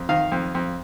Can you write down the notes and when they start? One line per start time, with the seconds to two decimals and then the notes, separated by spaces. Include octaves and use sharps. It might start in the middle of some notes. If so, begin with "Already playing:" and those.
Already playing: F2
0.09 D#3 F5
0.32 F2
0.55 F2